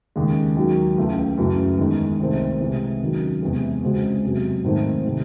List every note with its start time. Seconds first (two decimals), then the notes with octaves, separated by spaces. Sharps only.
0.16 D#2 C#3 G#3
0.56 D#2 D#3 F#3
0.98 C#2 C#3 E3 A3
1.37 F#2 C#3 E3 A3
1.78 E2 D#3 G#3
2.20 C2 C3 D#3 A3 C4
2.60 C3 E3 G#3
3.00 D#2 D#3 F#3 C#4
3.42 E2 C3 E3 G#3
3.82 C#2 C#3 G#3 C4 F#4
4.23 E2 C3 F#3
4.64 G#2 D#3 A3 C4
5.04 C3 D#3